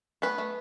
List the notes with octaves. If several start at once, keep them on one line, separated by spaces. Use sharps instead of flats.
A3 B3 B4
A3